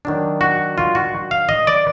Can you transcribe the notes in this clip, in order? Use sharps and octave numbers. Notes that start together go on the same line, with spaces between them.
D#3 F#3 D4
F#4
F4
F#4
F5
D#5
D5